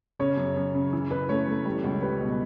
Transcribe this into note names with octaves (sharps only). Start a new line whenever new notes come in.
C#3 C#4 C#5
F#2
F#2
C#3
E3
E3 B4
A3 C#4 C#5
A3
G3
C#2
G3 B4
B2